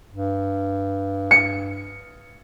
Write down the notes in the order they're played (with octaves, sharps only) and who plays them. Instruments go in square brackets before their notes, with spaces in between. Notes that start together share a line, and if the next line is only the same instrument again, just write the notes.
[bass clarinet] G2
[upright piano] C#7